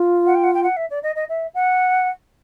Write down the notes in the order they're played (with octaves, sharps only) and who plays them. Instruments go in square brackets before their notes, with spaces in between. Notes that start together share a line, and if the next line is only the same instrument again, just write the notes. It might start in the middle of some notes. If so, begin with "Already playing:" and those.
Already playing: [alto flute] F4
[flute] F#5
G5
F#5
G5
F#5
E5
D5
D#5
D#5
E5
F#5